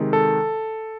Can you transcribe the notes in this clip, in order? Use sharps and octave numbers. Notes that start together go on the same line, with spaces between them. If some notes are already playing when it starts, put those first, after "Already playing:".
Already playing: C3 D#3 G#3
A4